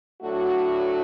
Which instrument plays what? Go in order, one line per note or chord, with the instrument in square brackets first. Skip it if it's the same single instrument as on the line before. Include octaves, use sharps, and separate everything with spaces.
[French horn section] A2 F#3 A3 D4 F#4